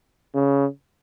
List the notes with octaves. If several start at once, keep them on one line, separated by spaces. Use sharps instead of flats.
C#3